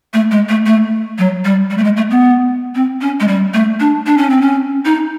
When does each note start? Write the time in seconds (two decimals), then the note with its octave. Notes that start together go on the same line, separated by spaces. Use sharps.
0.14 A3
0.31 G#3
0.49 A3
0.66 A3
1.18 F#3
1.45 G3
1.70 G3
1.78 A3
1.84 G#3
1.97 A3
2.10 B3
2.75 C4
3.01 C#4
3.20 G#3
3.28 G3
3.54 A3
3.80 D4
4.06 D4
4.18 C#4
4.30 C4
4.42 C#4
4.85 D#4